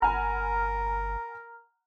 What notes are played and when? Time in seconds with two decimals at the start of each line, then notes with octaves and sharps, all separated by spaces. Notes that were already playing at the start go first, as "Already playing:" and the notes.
0.02 G1 A#4 F#5 G#5 A#5 B5 F6